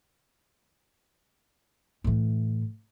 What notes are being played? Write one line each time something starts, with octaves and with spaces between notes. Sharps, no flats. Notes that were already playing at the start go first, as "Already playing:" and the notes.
A2 E3